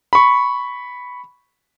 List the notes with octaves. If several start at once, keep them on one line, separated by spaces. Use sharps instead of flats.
B5 C#6